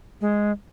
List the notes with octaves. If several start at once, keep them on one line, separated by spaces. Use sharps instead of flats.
G#3